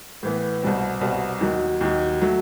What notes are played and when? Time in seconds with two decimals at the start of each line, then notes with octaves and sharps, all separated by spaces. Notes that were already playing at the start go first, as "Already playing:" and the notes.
0.23 A2 E3 B3
0.62 C2 B2 G3 C4
1.01 C2 B2 G3 C4
1.40 D#2 D#3 F#3
1.81 D#2 D#3 F#3
2.21 F#3 A3